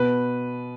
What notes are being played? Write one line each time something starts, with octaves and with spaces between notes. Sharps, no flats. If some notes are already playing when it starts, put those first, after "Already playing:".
Already playing: B2 B4